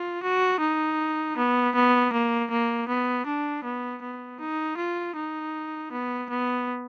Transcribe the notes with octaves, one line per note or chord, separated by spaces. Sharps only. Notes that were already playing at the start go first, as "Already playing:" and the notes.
Already playing: F4
F#4
D#4
B3
B3
A#3
A#3
B3
D4
B3
B3
D#4
F4
D#4
B3
B3